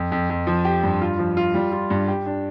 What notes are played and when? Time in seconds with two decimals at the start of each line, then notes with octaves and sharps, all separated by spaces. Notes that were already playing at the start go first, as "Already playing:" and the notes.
Already playing: F2
0.12 F2
0.30 F2
0.47 F3
0.65 G4
0.83 G2
1.01 F4
1.19 F3
1.37 F4
1.54 G3
1.72 F4
1.90 G2
2.08 G4
2.26 D4